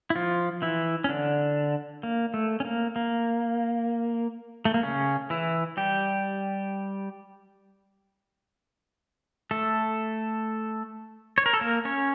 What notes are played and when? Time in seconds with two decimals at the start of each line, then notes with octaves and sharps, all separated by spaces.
0.10 E4
0.16 F3 F4
0.62 E3 E4
1.04 C#4
1.09 D3 D4
2.03 A#3
2.34 A3
2.60 C#4
2.65 A#3
2.96 A#3
4.65 A3
4.74 A#3
4.83 C#3 C#4
5.30 E3 E4
5.77 G3 G4
9.51 A3 A4
11.38 C#5
11.46 A#4
11.53 A4
11.61 A#3 A#4
11.85 C#4 C#5